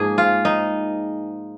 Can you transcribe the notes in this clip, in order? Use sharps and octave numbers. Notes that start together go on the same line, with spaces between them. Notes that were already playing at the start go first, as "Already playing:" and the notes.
Already playing: G#2 F3 A#3 G#4
F4
D#4